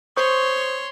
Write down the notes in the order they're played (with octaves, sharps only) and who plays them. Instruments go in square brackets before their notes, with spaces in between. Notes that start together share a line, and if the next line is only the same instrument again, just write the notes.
[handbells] C5 C#6 D#6 [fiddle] C#5 C6